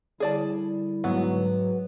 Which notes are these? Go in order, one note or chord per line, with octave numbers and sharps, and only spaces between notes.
D3 G3 E4 G#4 D5 A5
G#2 F#3 B3